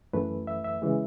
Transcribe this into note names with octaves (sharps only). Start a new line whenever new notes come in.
F#2 E3 A3 B4
E5
E5
C#3 E3 G#3